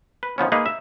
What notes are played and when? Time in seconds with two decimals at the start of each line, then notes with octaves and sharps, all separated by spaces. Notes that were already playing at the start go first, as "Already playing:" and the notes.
0.23 B4
0.38 D#3 F3 B3 C#4
0.52 G#3 A#3 D#4 G#4 B4
0.66 E5